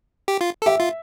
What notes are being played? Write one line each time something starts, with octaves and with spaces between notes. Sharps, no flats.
G4
F4
A4
G4 E5
F4